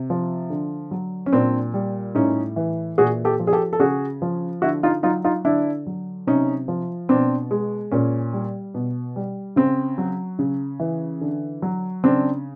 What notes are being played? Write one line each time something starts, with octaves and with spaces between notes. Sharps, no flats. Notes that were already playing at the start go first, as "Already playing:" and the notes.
Already playing: C3
F3
D3
F#3
C#4
A#2 C4 D4
G3
A2 C#4 D#4
E3
A#2 F#4 G#4
G4 A4
F3
G#4
G4 A4
A4
C#3 F#4 G#4
F3
D3 E4 F#4
D#4 F4
F#3 D#4 F4
D#4 F4
D3 D4 E4
F#3
C3 C#4 D#4
F3
B2 C4 D4
G#3
A#2 C#4
G3
B2
G3
C#3 C4
F#3
C#3
E3
D3
F#3
C#3 C4 D4